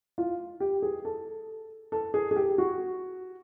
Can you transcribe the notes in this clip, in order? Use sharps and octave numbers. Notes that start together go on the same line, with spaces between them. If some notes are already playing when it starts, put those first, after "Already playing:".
F4
G4
G#4
A4
A4
G#4
G#4
G4
F#4